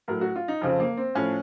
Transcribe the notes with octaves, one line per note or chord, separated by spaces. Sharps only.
A2 F#3 A#4
F#4
F4
D#4
F2 C#3 F3 C4
A#3
C4
A2 F3 C#4